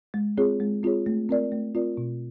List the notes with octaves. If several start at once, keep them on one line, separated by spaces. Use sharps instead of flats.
G#3
C4 F4 G#4 C#5
G#3
C4 F4 G#4 C#5
A3
C4 F4 A#4 D5
A3
C4 F4 A#4 D5
B2